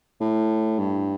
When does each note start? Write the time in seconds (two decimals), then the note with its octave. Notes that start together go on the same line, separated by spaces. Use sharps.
0.21 A2
0.78 G2